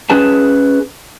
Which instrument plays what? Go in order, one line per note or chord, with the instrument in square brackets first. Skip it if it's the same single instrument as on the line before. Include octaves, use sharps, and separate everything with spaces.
[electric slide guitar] C#4 G#4 B4 A5